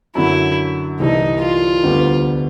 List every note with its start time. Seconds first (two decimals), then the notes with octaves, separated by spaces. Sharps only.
0.15 F#2 D3 F#3 E4
1.00 C2 C3 E3 A3 D#4
1.41 F4
1.83 D2 D3 G3 B3